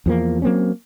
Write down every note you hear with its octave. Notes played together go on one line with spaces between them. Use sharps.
E2 F3 A#3
F#3 A#3 C4 C#4